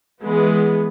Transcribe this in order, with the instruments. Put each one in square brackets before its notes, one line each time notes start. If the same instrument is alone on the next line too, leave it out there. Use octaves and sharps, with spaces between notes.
[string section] E3 G#3 B3